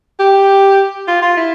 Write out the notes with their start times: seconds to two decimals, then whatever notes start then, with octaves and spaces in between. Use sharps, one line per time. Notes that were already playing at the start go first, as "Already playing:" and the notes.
0.20 G4
1.08 F4
1.22 F4
1.37 E4